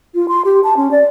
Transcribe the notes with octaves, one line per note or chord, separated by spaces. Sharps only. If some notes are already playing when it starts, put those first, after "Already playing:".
F4
C6
G4
A5
C#4
D5